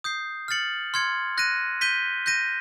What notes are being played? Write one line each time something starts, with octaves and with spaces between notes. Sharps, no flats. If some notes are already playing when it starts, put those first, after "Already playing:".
D#6 G6 C7
F6 A6 C#7 F#7
C6 F6 G#6 C#7
F#6 A#6 D#7
G6 B6 D#7 G7
G6 A#6 D#7